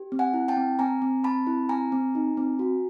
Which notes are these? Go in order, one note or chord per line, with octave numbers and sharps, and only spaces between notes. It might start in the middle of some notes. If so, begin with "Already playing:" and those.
Already playing: G4
C4
F#5 G#5
E4
G5 A5
C4
C4 G#5 A#5
C4
C4 A5 B5
E4
C4 G#5 A#5
C4
D#4
C4
F#4